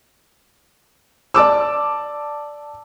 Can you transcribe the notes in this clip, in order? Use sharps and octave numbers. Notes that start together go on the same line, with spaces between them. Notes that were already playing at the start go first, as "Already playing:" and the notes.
D5 A5 D6 E6